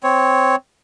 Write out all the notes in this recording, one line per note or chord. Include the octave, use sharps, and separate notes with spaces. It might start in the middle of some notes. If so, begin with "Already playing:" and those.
C4 C#5